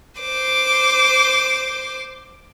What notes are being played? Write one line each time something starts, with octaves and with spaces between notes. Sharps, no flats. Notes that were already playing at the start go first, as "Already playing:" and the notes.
C5 D6